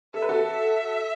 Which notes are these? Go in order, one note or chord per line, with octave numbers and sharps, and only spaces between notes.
A4 E5
B4
F#4 A4